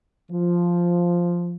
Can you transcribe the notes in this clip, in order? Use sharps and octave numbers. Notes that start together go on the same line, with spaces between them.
F3